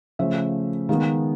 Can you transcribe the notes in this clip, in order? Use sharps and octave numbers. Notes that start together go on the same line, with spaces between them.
C#3 F3 A3 E5
D#3 G#3 B3 F5